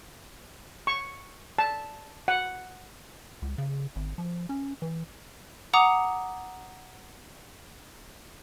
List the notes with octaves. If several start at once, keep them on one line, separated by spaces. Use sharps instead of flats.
C#6
A5
F#5
C#2
C#3
G#1
F3
C#4
E3
F#5 A#5 D6 D#6 C#7 F7